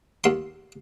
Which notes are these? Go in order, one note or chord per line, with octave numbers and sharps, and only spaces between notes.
D#2 C6